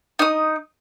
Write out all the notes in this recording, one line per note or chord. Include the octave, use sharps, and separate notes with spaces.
D#4 D#6